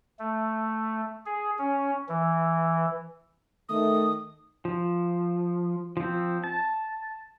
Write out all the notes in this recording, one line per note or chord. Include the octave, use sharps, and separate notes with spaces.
A3
G#4
C#4
E3
D#3 A3 D#6
F3
F3 C4
A5